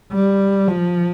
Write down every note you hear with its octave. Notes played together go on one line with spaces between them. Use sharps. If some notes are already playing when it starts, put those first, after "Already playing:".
G3
F3